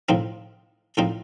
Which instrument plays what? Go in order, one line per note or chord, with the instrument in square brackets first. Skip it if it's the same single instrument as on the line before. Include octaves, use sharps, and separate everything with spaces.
[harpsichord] A2 F3 C4 D#4
A2 F3 C4 D#4